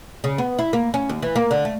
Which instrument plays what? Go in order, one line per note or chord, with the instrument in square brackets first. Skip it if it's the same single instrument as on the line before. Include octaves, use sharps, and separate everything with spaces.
[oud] C#3
B3
E4
A#3
C#4
D#2
E3
A#3
D3
A3